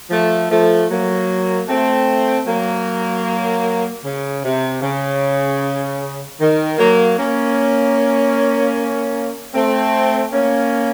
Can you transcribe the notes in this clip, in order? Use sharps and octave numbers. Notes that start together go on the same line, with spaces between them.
F3 A3
F3 A3
F#3 A#3
A3 C4
F#3 A#3
C#3
C3
C#3
D#3
F#3 A#3
A#3 C#4
A3 C4
A#3 C#4